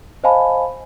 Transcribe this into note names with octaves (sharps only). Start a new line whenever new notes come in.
C5 D#5 F5 G#5 A5 B5